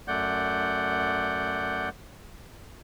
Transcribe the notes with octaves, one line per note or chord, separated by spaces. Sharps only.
F#2 A3 D5 F#5 G6